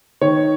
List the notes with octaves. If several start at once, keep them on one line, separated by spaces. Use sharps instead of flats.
D#3 C#5